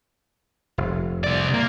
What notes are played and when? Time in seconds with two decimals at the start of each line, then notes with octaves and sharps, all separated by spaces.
0.78 F1
1.24 C2 D5
1.54 A#3